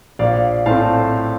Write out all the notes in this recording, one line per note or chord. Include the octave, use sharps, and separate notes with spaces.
A#1 D5 F5
A2 A3 C4 F5 A5